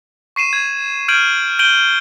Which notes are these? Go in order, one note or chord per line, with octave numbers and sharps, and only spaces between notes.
C#6 C7 D#7 E7
G#6
F6 G6 G#6 D7 D#7 F#7
G6 D7 D#7 F#7 G7